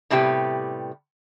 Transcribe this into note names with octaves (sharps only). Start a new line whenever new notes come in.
A2 C3 G3 B3 G4